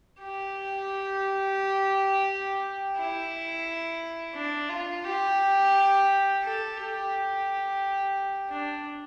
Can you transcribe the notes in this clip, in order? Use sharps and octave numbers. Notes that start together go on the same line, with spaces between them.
G4
E4
D4
F4
G4
A4
G4
D4